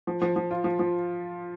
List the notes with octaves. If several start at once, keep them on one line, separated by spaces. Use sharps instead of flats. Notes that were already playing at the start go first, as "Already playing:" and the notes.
F3
F3
F3
F4
F3
F3